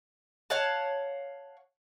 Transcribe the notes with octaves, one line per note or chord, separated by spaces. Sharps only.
C#5 F5 F#5 A5